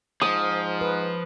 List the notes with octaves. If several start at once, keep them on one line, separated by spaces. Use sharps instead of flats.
G#2 F3 D#6
B4